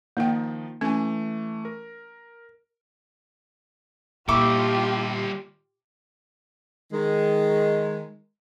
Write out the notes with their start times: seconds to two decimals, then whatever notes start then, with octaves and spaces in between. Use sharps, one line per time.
0.17 D#3 F3 A#3 D#4 G5
0.81 E3 A3 C#4 G#5
1.65 A#4
4.29 A#2 G3 E4 F4 G4 A4 C#6 D6
6.92 D#3 G#3